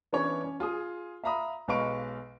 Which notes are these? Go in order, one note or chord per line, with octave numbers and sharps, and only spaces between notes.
E3 B3 C#4 D4 C#5
C#4
F4 G#4 G#5 D#6
E5 F5 A#5 B5 D#6
B1 G#3 B4 F5 C#6 D7